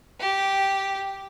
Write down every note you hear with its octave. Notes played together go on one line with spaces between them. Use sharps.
G4